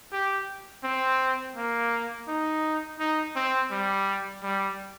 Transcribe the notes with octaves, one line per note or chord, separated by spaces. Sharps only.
G4
C4
A#3
D#4
D#4
C4
G3
G3